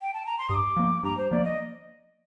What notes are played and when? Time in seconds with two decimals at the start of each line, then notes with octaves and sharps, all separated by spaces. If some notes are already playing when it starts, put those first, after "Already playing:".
0.02 G5
0.14 A5
0.26 A#5
0.38 C6
0.49 G2 D#6
0.55 D6
0.76 F3 A#3
1.03 G2 A#5
1.17 C5
1.31 F3 A#3 D5
1.44 D#5